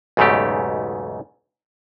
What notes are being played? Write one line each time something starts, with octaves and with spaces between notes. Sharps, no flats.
B1 E2 G#2 C#3 A3 G4